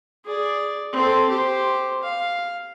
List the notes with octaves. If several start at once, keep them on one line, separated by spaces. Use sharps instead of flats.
G#4 D5
C4 A4
G4 C5
F5